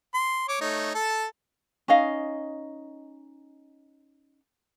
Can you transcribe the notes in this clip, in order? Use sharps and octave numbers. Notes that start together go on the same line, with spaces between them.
C6
C#5 D6
A3 D#4 C#5
A4 A5
C#4 D#4 D#5 F5